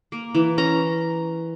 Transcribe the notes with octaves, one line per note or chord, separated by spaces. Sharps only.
A#3
E3
C#4 A#5